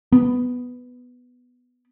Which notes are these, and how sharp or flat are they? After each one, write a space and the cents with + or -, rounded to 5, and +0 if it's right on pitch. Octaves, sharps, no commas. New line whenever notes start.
B3 +5